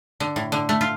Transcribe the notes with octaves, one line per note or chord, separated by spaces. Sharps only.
D3
A2
D3
A3
F4